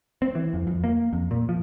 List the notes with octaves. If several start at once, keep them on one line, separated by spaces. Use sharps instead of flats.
C4
E3
F2
F2
A#3
F2
A#2
F3